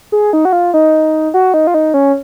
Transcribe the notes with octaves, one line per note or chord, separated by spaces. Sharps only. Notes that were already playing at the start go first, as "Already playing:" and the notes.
G#4
D#4
F#4
F4
D#4
F#4
D#4
F4
D#4
C#4